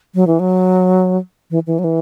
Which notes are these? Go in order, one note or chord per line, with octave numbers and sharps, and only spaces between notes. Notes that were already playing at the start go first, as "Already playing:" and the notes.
F#3
E3
F#3
E3
E3
F#3
E3